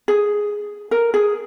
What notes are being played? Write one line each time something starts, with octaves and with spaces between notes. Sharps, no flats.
G#4
A#4
G#4